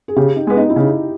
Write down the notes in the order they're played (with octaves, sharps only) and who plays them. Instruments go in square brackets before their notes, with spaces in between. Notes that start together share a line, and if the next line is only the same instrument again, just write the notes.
[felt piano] G#4
[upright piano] C#3 [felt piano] G4
[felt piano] D#4
[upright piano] G#3 B3
[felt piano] D#4
E4
[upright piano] C#3 [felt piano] D#4